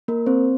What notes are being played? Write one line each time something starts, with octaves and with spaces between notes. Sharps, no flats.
A#3 A#4
C4 C5